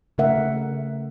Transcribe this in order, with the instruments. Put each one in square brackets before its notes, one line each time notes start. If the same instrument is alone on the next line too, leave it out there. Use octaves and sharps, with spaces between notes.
[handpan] C#3 A3 A#4 E5 F#5